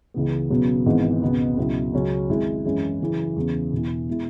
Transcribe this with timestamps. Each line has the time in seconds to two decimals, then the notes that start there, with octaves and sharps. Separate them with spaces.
0.14 C#2 C#3 E3 B3
0.50 E1 E2 C#3 F#3 B3
0.86 G#1 G#2 E3 B3
1.22 C#2 B2 B3
1.57 C#2 B2 F#3 E4
1.93 C#2 C#3 F#3 C#4
2.29 G#1 G#2 G#3 E4
2.65 F#2 E3 G#3 C#4 E4
3.00 F#2 C#3 E3
3.36 E2 C#3 E3
3.72 E1 E2 E3
4.09 B2 G#3 E4